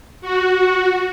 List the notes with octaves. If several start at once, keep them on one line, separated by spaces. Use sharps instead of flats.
F#4
F#4